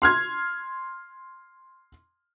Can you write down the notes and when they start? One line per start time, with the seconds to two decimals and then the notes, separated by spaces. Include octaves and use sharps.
0.02 C6 F6 G#6